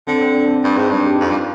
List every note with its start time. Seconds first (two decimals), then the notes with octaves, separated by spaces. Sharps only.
0.07 D3 C4
0.21 C4
0.34 D4
0.46 C4
0.64 G2
0.77 G#2
0.90 G2 D4
1.06 G4
1.15 D#4
1.20 F2 F4
1.30 G2